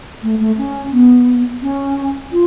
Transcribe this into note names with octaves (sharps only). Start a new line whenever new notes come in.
A3
A3
C#4
B3
C#4
F4